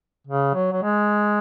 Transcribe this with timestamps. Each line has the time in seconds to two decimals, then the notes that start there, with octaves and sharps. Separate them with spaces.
0.27 C#3
0.54 F#3
0.73 F#3
0.82 G#3